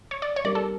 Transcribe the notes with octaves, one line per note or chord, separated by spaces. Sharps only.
C#5
D5
C#5
G3 C4 D#4 G4 A#4 D5
A4